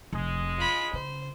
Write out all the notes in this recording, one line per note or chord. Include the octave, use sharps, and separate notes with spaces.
F1 G#3
F4 B5
C#3 C5